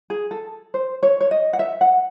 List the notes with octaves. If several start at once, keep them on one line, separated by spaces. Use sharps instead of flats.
G#4
A4
C5
C#5
C#5
D#5
F#5
E5
F#5